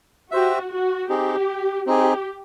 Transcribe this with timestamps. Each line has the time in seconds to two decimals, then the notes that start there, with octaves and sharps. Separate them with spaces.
0.31 F#4 G4 C5 E5
0.70 F#4
1.09 C4 D#4 G4 G#4
1.86 C4 D#4 G4 G#4